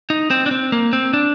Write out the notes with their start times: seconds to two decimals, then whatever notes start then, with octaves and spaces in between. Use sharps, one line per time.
0.10 D#4
0.31 C4
0.46 D4
0.51 C4
0.72 A#3
0.93 C4
1.13 D4